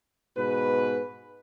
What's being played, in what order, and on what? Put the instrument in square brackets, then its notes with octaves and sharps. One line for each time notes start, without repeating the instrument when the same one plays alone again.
[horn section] G#2 B2 B4